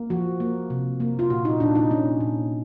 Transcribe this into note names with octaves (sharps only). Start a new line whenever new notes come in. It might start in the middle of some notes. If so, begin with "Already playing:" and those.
Already playing: A#3
F3 F#4
A#3
C3
A#3
F4
A#2 F#4
D#4
A#2 D4
D#4
A#2 C#4
A#2